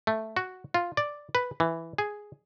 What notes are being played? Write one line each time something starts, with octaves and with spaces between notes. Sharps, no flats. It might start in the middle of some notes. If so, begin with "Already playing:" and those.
A3
F#4
F4
D5
B4
E3
G#4